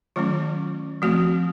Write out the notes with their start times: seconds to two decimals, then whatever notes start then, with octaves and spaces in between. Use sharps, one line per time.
0.16 D#3 F#3 A3 C#4 F4
1.02 F3 A3 C4 F#4